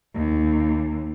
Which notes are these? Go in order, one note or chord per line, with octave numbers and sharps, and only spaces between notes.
D#2